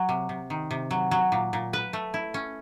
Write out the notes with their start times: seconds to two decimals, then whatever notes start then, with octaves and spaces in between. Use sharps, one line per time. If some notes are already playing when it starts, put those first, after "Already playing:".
Already playing: F#3
0.09 C3
0.29 C3
0.50 D#3
0.71 C3
0.91 F#3
1.11 F#3
1.32 A#2
1.53 A#2
1.73 B4
1.93 A3
2.14 E4
2.34 C#4